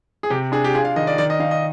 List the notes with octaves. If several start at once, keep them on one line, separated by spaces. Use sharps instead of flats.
G#4
C3 G4
D4 G#4
G4
F4 G#4
F5
D#3 D#5
D5
D#3 D5
D#5
D#3 F5
D#5